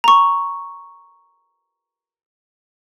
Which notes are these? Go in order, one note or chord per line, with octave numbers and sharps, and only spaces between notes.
A#5 C#6